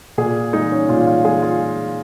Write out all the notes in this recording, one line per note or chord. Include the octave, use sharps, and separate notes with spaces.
A#2 G#4
G#3 D#4
C#4
A#2 F4
F4
G#3 G#4
F4